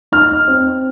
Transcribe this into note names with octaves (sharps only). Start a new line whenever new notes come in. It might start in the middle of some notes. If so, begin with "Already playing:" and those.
D#4 F6
C4